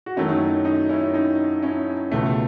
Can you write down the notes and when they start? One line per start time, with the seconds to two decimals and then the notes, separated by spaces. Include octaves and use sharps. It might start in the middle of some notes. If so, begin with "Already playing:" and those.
0.06 F#4
0.17 F#2 D#3 F#3 A3 C#4 E4
0.29 D#4
0.41 C#4
0.65 D#4
0.89 C#4 E4
1.14 D#4
1.62 C#4 E4
2.11 C#2 B2 A3